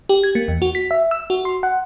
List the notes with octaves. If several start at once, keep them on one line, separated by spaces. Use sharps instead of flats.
G4
G#6
A#3
E2
F#4
B6
E5
E6
F#4
C6
F#5